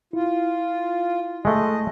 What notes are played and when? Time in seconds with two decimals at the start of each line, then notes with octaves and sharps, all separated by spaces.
0.13 E4 F4
1.45 G#3 A3 D#5